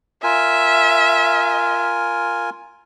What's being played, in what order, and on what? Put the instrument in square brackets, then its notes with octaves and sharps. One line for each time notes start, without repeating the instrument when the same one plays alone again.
[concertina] F4 A#4 G#5 [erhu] E5